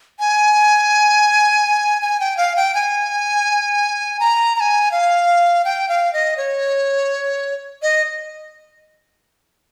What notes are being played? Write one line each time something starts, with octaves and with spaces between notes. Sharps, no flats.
G#5
G#5
G5
F5
G5
G#5
A#5
A#5
G#5
F5
G5
F5
D#5
C#5
D#5